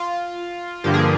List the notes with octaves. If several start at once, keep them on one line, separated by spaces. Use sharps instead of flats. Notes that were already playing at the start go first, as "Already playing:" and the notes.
Already playing: F4
G2 D3 F3 A#3 G4
G#4